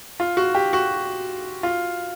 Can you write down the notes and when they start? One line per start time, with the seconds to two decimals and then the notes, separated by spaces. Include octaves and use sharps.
0.20 F4
0.37 F#4
0.55 G4
0.73 F#4
1.63 F4